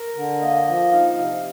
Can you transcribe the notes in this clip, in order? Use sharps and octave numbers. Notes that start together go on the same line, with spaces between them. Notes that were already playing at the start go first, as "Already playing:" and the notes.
Already playing: A#4
D3
A#3 D#5
F3
D#4 F5
C3